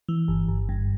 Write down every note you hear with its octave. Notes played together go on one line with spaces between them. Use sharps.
E3
G1
G1
G2